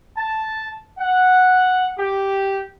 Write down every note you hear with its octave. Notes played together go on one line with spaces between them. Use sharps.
A5
F#5
G4